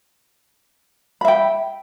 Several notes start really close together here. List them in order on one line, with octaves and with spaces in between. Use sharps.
B5 E5 G5